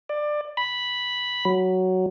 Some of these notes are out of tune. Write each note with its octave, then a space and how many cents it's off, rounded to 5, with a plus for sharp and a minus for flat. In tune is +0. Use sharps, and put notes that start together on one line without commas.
D5 +20
B5 -5
F#3 +5